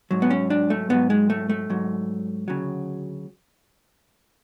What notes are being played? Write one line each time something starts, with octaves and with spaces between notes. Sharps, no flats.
G#2 F#3
B3
C#4
D4
A3
G#2 F#3 B3
G#3
A3
A3
G#2 F#3
D2 C#3 F#3